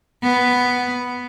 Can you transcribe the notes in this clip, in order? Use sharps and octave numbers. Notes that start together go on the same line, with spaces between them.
B3